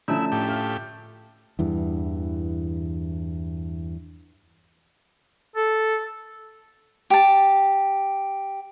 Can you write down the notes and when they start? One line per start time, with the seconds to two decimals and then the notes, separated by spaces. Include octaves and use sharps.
0.08 D3 F3 A3 C#4 E4 A5
0.32 A2 G4
0.48 F4 F6
1.59 E2 G2 E3
5.56 A4
7.10 G4 A5